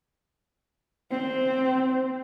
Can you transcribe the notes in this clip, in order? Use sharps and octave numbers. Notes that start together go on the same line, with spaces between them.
C4